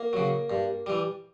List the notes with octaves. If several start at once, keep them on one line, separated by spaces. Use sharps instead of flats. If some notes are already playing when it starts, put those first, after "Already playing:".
Already playing: A#3
C#3 F#3
G2
E3 G3